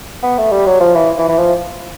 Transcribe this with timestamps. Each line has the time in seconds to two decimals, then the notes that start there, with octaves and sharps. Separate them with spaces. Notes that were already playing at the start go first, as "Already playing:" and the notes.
0.23 B3
0.38 A3
0.51 G3
0.66 F#3
0.80 F3
0.95 E3
1.18 E3
1.28 E3
1.38 F3